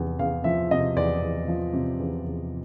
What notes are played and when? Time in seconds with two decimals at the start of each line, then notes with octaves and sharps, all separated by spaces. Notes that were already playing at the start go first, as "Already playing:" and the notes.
Already playing: E2 C3 F3
0.19 E2 F5
0.44 F3 E5
0.71 C3 D#5
0.96 E2 D5
1.22 E2
1.48 F3
1.74 C3
2.00 E2
2.25 E2